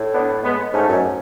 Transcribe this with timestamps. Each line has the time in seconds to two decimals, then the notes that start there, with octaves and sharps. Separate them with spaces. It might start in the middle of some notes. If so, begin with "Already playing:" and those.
Already playing: A2
0.13 B3 D4
0.43 G#3 B3
0.73 G#2 A3 C#4
0.88 F#2